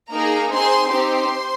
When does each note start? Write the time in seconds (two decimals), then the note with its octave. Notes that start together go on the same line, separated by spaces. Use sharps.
0.11 A#3 D#4 G#4 A#4 A#5
0.51 C4 D#4 G#4 C5 C6
0.90 C4 D#4 G4 C5 C6